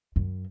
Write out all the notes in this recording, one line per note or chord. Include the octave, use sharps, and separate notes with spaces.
F#2